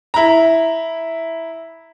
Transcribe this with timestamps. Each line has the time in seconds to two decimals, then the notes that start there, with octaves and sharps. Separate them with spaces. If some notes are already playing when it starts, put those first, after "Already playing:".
0.14 E4 A#5